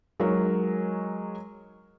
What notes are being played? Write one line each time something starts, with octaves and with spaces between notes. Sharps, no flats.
F#3 G#3 D#4 A#4 C#5